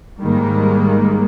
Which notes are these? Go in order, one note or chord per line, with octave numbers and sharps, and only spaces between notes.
G#2 D#3 G3 G#3 A#3